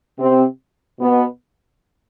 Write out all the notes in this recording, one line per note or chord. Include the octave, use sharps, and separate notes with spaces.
C3 C4
B2 B3